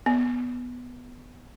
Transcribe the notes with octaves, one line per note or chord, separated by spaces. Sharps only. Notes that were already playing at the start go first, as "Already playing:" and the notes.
B3